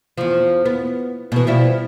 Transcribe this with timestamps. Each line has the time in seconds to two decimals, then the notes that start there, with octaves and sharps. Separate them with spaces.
0.17 E2 F3
0.65 B3
1.32 B2 E3
1.47 F3 G3 E4